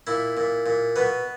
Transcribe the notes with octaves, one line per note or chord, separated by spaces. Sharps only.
A#2 E4
A#2
A#2
B2 B3